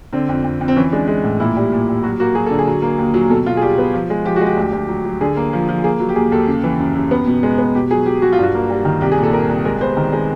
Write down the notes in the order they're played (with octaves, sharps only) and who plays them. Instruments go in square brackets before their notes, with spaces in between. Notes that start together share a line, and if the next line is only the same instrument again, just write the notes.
[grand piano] D3 C4
F2
F2
F2
C4
E3 C#4
G#3 D4
G#3
A2
A#2 E4
G3
A#2
G3
F#3 F#4
A#3 F#4
F#3 G#4
D3 A4
G#4
F#3
A#3
D#2
F#3
B2 A4
B2 F4
G#4
G3 G4
B3
F3
G#3
F3 G4
F#4
G#3
G4
D2
D2
F#3
F#3
D3 G#4
A#3
F3
F3
A#3 G#4
F#3
G4
D#2 G#4
D#2 A4
C#3
E3
F#2
F#2
B3
B2
G#3
B3
B2 G4
F#3 G#4
F#3 G4
F#3 F#4
F4
G2 F#4
A#3
G3
D#3
C2 G4
G#4
A#2
A4
C2 A#4
C2
G#3 A#4
B3 C5
D#3
G#3